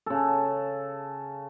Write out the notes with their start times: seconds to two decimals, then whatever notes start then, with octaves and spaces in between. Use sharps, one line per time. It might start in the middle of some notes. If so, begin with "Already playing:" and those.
0.06 C#3 A4